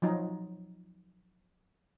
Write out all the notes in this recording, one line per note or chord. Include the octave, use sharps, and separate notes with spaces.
F3 F#3 D#4